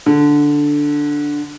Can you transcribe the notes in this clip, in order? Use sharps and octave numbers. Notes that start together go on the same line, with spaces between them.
D3